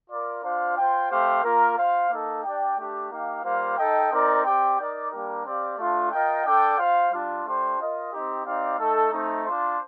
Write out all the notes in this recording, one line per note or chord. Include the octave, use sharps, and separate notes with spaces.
F4 A#4 D5
D4 F4 C5 F5
F4 C5 G5
A3 C4 G4 C5 F5
A#3 F4 A#4
F4 C5 F5
A#3 D#4 A4
D4 G4 D5 G5
A3 D4 G4
A#3 D#4 G4 A#4 F5
G3 A#3 F4 C5 F5
D#4 A4 D#5 G5
C4 D#4 A#4 D5
C4 G4 D5 G5
D#4 A#4 D5
G3 A#3 D4 G4 A#4
C4 G4 D5 F5
A3 D4 F4
F4 A#4 D#5 G5
D4 A4 D5 G5
F4 C5 F5
G3 D4 F4
A3 D4 G4 C5
F4 A#4 D#5
C4 D#4 G4
C4 D#4 G4 D5 F5
A3 D#4 A4
A3 C4 D#4
D4 F4 C5